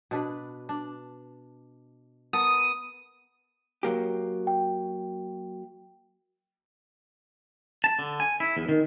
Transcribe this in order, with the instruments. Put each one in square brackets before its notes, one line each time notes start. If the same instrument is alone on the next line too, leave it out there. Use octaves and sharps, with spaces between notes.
[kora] B2 D4 B4
D4
[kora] B3 A4 A#4 [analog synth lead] D#6
[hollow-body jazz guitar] F#3 A#3 G4
[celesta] G5
[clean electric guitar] A5
D3
G#5
E4
E2
D#3